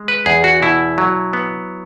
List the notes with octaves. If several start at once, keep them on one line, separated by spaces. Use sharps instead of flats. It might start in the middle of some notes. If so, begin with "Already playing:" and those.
Already playing: G#3
B4
E2 G#4
F#4
B2 E4
F#3
B3